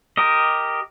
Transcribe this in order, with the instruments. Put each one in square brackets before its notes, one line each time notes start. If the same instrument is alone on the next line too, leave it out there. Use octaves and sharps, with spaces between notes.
[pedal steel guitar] G4 A#4 D#5